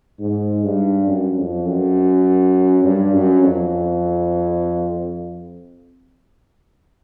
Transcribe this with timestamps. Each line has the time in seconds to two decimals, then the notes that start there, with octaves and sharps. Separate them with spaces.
0.20 G#2
0.64 G2
1.07 F#2
1.37 F2
1.66 F#2
2.84 G2
3.13 F#2
3.43 F2